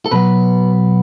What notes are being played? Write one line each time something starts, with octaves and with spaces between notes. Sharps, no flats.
A4
B2 F#3 B3 B4